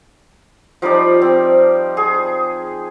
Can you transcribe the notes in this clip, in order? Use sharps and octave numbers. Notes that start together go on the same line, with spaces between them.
F3 G3 D#4 D5
C4
G#4